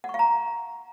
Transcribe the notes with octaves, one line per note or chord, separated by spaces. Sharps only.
F#5
C#6
F5
A#5